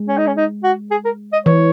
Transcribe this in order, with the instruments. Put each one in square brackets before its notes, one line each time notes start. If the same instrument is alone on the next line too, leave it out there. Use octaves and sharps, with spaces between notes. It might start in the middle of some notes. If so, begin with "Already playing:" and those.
Already playing: [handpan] G#3
[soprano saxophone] C#4
D#4
C#4
D#4
F#4
G#4
A#4
D#5
[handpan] E3 [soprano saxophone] C#5